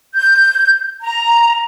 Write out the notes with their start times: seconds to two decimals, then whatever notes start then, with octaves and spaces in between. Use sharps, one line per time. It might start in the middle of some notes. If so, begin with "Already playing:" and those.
0.15 G6
1.00 A#5